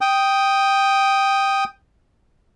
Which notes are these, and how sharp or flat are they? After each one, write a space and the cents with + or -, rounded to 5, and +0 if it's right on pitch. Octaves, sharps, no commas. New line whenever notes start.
G5 +0 D#6 +0